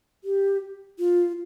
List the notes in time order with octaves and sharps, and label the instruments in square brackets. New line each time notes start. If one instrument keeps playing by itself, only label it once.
[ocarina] G4
F4